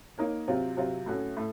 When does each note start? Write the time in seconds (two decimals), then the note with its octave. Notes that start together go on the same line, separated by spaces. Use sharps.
0.18 A#3 D#4 A#4 C#5
0.48 C3 F#3 C4 F4
0.77 C3 F#3 C4 F4
1.06 A2 A3 C#4 F#4
1.37 A2 A3